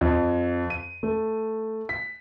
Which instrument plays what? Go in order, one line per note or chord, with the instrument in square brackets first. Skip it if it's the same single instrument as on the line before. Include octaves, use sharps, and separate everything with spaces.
[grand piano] F2
D#7
A3
B6